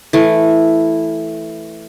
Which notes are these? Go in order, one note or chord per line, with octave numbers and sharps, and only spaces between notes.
E3 A3